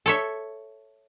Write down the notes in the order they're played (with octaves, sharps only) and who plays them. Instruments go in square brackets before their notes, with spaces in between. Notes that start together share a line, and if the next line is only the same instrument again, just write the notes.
[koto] A4 C#5 E5